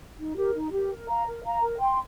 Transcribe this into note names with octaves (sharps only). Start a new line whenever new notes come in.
D#4
G4 A#4
D#4
G4 A#4
A#4
F5 A#5
A#4
F5 A#5
A#4
G5 C6